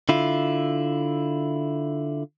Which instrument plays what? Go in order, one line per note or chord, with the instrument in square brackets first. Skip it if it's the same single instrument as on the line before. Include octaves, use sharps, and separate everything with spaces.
[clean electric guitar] D3 E4 F4